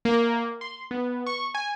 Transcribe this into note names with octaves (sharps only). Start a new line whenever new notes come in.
A#3
C6
B3
C#6
G#5